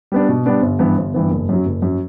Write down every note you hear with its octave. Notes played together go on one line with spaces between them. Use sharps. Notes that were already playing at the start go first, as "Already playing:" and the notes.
G3 B3 D4
B2
G3 B3 D4
G1
G2 E3 B3
G1
G2 E3 B3
F#1
F#2 F#3
F#1
F#2 F#3